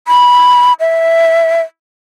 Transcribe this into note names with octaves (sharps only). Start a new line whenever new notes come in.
B5
E5